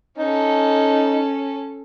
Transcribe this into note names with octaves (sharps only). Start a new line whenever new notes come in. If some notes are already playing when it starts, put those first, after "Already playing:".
C#4 D#4 A4